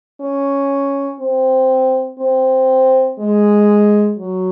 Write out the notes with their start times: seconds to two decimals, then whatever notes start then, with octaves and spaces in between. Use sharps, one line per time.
0.21 C#4
1.20 C4
2.19 C4
3.19 G#3
4.18 F#3